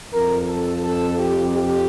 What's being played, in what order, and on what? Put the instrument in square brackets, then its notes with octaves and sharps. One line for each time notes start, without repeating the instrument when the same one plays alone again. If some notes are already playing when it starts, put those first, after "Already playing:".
[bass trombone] F2 [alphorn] A#4
[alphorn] A4
A4
G4
G4